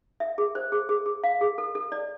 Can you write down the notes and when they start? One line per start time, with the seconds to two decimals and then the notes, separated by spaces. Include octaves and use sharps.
0.20 E5
0.38 G#4
0.55 C5
0.72 G#4
0.89 G#4
1.06 G#4
1.24 F5
1.41 G#4
1.58 A4
1.75 A4
1.92 D5